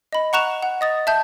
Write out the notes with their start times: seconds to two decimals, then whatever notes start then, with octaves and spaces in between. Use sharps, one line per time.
0.13 D#5 B5
0.33 F#5 A#5 C#6 F#6 E7 F7
0.63 F#5
0.81 D#5 D#6 A6
1.07 E5 A5 G6